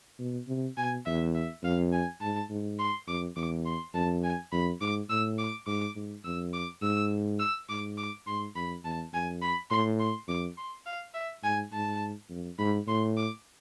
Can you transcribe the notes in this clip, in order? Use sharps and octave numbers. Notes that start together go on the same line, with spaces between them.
B2
C3
B2 G#5
E2 E5
E5
F2 F5
G#5
G#2 A5
G#2
C6
F2 D6
E2 D6
C6
F2 A5
G#5
F2 B5
G#2 D6
A2 E6
D6
G#2 D6
G#2
F2 E6
D6
G#2 E6
E6
G#2 D6
D6
G#2 C6
F2 B5
E2 A5
F2 G#5
B5
A2 C6
C6
F2 D6
C6
F5
E5
G#2 G#5
G#2 A5
F2
G#2 B5
A2 C6
D6